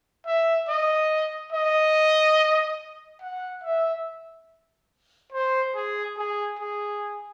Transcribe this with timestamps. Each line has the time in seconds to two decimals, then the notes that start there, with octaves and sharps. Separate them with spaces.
0.26 E5
0.68 D#5
1.52 D#5
3.21 F#5
3.64 E5
5.32 C5
5.75 G#4
6.17 G#4
6.59 G#4